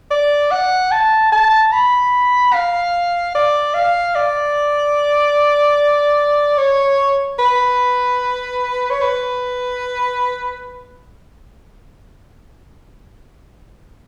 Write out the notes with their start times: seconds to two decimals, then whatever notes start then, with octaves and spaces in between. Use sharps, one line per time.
0.11 D5
0.51 F#5
0.91 A5
1.32 A5
1.73 B5
2.53 F5
3.35 D5
3.74 F5
4.15 D5
6.58 C#5
7.39 B4
8.90 C#5
9.01 B4